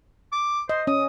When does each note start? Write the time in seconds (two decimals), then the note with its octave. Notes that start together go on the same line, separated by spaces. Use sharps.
0.33 D6
0.69 C5 D#5
0.87 C#4 D#6